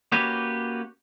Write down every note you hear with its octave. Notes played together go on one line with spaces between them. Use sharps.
A#3 C#4 F#4 G4 B4 C#5